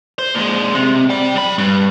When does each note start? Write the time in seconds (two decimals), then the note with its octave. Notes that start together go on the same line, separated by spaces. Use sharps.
0.19 C5
0.35 A#2 G#3
0.75 C3
1.09 D5 G5
1.36 F3 B5
1.58 G2